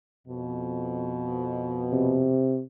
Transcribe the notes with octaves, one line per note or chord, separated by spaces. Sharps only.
F2 B2
C3